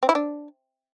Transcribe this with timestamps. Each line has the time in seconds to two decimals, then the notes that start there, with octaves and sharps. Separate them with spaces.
0.03 C4
0.09 E4
0.15 D4